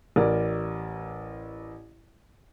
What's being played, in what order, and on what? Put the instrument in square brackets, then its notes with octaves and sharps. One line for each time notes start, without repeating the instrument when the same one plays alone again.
[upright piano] A1 A#4 D5